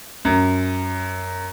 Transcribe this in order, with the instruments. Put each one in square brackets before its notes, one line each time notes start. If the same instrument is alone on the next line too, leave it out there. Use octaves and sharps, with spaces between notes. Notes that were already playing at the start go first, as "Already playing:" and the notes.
[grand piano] F#2